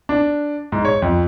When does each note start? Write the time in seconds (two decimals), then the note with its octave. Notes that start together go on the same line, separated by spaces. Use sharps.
0.09 D4
0.72 G#2
0.85 C#5
1.02 F2